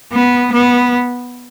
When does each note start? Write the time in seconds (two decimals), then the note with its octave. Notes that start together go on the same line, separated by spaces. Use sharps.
0.13 B3
0.52 B3